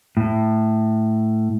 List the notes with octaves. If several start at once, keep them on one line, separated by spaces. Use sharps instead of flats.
A2